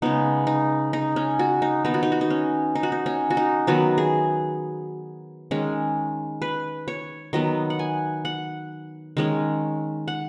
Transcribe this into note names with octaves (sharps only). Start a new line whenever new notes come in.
C#3 G#3 B3 D#4
D#4
D#4
C#4
F#4
D#4
D#3 B3 D#4
F#4
D#4
F#4
D#4
C#4
D#4
F#4
D#4
C#4
F#4
D#4
D#3 F#3 B3 F#4
G#4
D#3 G#3 C#4
B4
C#5
D#3 F#3 B3 D#5
F#5
G#5
F#5
D#3 G#3 C#4
F#5